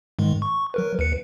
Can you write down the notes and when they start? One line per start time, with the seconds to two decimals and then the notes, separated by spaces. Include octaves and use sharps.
0.19 G#2 D#3 G#3
0.42 C#6
0.74 F#3 A#4 B4
0.99 D#2 B4 C#7